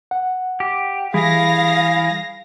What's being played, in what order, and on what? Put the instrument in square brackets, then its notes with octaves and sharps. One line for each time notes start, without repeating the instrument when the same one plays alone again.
[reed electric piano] F#5
[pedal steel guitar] G4
[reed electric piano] E3 G3 [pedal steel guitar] E4 [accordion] G#4 [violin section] F5 A#6